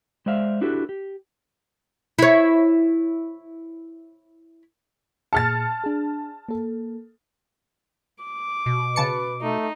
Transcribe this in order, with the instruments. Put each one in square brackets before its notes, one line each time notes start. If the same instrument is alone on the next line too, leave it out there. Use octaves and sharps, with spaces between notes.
[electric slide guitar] G#3 C5 D5 E5 F5
D4 E4 F#4 G4 A4 B4
G4
[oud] E4 C#5
[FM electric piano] A#2 G#4 C#7 [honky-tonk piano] A5 F6 A6
[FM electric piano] D4 G#4
A#3 A4
[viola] D6
[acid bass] B2
[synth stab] C#3 A5 C#7 [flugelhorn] B4
[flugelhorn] A3 [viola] D#4